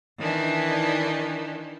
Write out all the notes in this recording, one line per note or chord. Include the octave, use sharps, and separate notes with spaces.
D#3 E3 D4 D#4